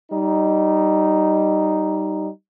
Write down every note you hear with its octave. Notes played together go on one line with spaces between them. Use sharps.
G3 D#4